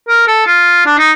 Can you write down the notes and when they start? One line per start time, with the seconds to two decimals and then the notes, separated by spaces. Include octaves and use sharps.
0.08 A#4
0.27 A4
0.47 F4
0.86 D4
0.98 D#4